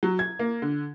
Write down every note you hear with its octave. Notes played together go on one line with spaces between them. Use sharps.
F#3
G#6
A#3
D3